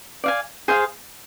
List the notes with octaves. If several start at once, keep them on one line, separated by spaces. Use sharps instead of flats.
D5 F5 G#5
G#4 C5 F5